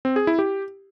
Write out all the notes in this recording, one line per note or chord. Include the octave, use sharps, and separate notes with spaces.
C4
G#4
E4
G4